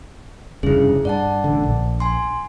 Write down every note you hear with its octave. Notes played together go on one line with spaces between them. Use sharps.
F1 G2 C#3 E4 G#4
G2 D5 F#5 A5
A1 D3
A#1
G#5 C6